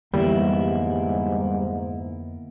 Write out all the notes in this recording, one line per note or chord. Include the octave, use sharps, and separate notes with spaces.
F2 G#2 D3 E3 G3 A#3 B3 E4